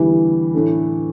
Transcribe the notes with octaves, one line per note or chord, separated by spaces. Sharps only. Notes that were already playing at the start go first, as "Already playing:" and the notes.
Already playing: E2 D3 E3 G3
A2 A3 D4 A4